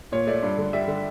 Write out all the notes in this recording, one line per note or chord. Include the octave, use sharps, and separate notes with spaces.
A#2 C#5
A3 D5
G2
D3
G3 E5
D3